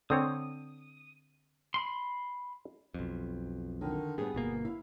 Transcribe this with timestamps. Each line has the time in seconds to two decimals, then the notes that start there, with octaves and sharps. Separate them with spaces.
0.10 D3 C4 C#5 D#6
1.74 B5 C6
2.94 B1 F2
3.81 D3 D#3
4.18 G2 B3 G#4
4.35 G1 B2 A#3
4.65 E4 F5